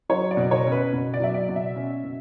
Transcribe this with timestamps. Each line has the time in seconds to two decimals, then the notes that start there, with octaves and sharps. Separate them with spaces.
0.09 F#3 C#5
0.31 D5
0.37 B2
0.51 C#5
0.65 C#4
0.72 B4
0.93 B2
1.14 D5
1.20 F#3 E5
1.34 D5
1.48 B2
1.56 E5
1.76 C#4
2.04 B2